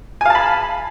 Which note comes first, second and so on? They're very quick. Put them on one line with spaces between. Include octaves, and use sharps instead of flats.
G#5 F5 A5 B5